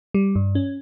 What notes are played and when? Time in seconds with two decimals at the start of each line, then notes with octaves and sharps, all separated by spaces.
0.14 G3
0.35 G2
0.55 C#4